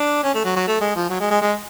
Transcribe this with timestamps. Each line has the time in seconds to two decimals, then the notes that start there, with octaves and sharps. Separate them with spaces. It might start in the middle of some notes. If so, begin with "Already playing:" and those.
Already playing: D4
0.23 C#4
0.34 A3
0.45 F#3
0.56 F#3
0.67 A3
0.81 G#3
0.96 F3
1.10 F#3
1.20 G#3
1.31 G#3
1.42 G#3